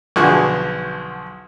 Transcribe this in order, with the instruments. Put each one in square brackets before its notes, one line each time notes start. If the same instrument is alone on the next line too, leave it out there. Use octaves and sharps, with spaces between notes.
[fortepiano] B1 D3 F3 F#4 G#4 C#6